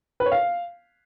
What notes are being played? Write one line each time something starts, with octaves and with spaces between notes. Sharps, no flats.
B4
C#5
F5